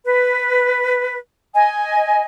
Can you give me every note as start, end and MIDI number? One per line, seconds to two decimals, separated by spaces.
0.05 1.17 71
1.54 2.25 75
1.54 2.25 80